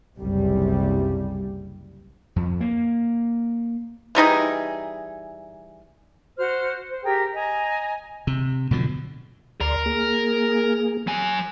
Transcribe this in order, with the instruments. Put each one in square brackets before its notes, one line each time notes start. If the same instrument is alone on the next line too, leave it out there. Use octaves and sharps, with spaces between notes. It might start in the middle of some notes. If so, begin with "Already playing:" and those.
[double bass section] F#1 C2 G3
[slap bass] F2
A#3
[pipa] E3 G3 D#4 G#4
[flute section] F#4 C5 F6
C5
G4 G#4 A#4 G5
D#5 G#5 A#5
[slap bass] C3
B2 D3 F3 F#3
[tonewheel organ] D2 D5 C6 [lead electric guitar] A#4 A#5
[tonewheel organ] A#3 G#4
[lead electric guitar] F#3 G#5